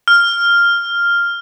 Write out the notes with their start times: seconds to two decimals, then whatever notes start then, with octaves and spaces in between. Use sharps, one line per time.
0.08 F6